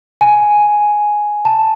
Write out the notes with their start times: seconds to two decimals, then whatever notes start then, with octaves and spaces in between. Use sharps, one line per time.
0.21 G#5
1.45 A5